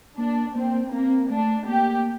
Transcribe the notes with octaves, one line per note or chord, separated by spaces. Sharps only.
A#3 D4
A#3 C4
A#3 C4
A3 D4
A#3 G4